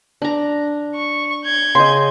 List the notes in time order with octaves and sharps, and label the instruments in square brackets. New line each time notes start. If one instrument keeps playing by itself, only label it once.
[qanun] D4 A#5
[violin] C#6
G6 G#6
[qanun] C#3 [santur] D#5 C6